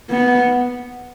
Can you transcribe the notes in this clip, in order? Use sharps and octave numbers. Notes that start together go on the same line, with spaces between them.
B3